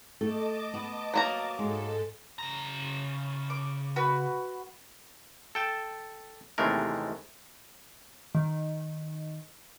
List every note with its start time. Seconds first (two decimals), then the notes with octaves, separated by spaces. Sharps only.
0.21 A3 A4 D#5 A5 D6
0.74 B3
1.14 F#3 A#3 A#5
1.59 G#2 G#3 A4
2.39 C#3 A#5
3.50 D6
3.96 F#4 B4
5.55 A4 G5 A5
6.58 D#2 C3 E3 G#3 A3 A#4
8.35 D#3